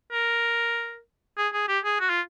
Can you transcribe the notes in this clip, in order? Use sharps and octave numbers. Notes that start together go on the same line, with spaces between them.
A#4
G#4
G#4
G4
G#4
F#4
F4